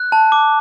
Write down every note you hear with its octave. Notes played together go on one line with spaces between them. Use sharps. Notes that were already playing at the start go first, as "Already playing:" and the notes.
Already playing: F#6
A5
D6